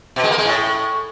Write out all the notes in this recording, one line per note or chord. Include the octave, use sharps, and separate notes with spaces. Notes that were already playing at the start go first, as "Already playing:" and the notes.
B2
G#3
A#3
G#3
A2